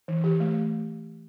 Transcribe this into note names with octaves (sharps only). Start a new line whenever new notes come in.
E3
E3 G4
A3